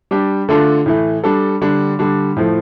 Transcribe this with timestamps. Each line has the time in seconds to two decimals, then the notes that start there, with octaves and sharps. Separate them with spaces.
0.11 G3 D4 G4
0.49 D3 A3 D4 F4 A4
0.86 A2 E3 A3
1.24 G3 D4 A4
1.61 D3 G3 D4
1.99 D3 G3 D4
2.36 A2 F3 A3